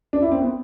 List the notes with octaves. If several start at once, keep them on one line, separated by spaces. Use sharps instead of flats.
D4
E4
C4
B3